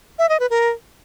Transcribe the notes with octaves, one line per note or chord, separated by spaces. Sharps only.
E5
D#5
B4
A#4